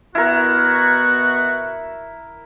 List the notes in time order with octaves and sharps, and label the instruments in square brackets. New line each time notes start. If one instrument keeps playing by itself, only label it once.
[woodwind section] B2 B3 F#4 [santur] E4 A#4